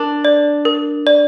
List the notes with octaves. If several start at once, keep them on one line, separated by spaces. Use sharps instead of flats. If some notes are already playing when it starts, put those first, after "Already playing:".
Already playing: D4 A#4
D5
A#4
D5